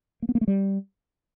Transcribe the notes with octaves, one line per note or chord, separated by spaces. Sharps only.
A#3
B3
A#3
A3
G3